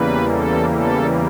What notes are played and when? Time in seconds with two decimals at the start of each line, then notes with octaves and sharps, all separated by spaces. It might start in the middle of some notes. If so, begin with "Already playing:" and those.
Already playing: E2 C#3 E3 G3 A#3 B4
0.28 A4
0.70 A4